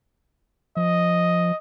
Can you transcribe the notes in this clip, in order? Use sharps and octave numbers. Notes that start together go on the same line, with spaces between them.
F3 D#5